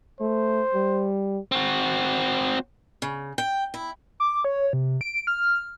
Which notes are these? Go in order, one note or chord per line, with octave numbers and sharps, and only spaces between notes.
A3 C5
G3
C4 F#4
C#3
G5
E4
D6
C#5
C3
D7
F6